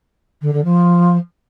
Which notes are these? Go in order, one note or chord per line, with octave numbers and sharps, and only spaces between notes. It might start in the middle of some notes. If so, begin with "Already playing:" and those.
D3
D3
F3